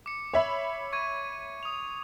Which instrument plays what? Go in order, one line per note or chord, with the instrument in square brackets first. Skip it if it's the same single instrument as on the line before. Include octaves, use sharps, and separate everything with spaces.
[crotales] D6 C#7
[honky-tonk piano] C#5 E5 B5
[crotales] C#6 G#6 D#7
D#6 F7